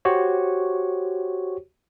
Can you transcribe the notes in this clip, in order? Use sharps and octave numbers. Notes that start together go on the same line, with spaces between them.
F#4 G4 C5 C#5